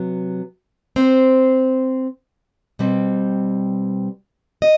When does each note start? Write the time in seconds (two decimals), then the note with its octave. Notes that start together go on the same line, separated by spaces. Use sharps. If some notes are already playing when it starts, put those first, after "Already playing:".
Already playing: C3 F#3 B3
0.96 C4 C5
2.79 B2 G3 C4
4.62 D#5